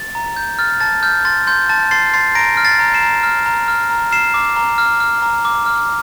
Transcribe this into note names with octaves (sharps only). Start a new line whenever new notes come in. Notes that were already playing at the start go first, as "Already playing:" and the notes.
Already playing: A6
A#5
G6
F6 A6
A5 A6
F6 G6
C6 A6
C6 G6
A5 A6
C6 A6 C7
C6 A6 C7
A#5 A#6 D7
F6
A6 C7
A#5
C7 E7
A#5
F6
A#5
F6
A#5
F6 C7 E7
D6
A#5
F6
F6
A#5
D6
F6